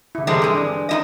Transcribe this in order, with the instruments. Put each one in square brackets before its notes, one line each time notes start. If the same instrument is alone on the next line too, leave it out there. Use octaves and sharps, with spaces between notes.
[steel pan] D3 E4
[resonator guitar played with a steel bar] C3 G3 G#3 [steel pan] E3 C4 A4
[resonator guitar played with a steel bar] G2 G#3
[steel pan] D4
[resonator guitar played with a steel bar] D#4 E4 D#5